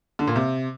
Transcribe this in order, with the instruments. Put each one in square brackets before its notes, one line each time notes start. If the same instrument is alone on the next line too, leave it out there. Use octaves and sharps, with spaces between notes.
[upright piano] D3
A#2
C3